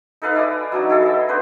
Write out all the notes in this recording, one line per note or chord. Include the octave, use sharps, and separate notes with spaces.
D#4 A4 B4 F5
E4 D5 G#5 D#6
F#3 D4 D#4
E4 G#4 A4
D#5 E5
B3 D4 B4 C5